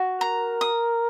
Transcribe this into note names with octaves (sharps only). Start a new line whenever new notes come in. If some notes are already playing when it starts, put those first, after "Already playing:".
Already playing: F#4
A#4 A#5
D#6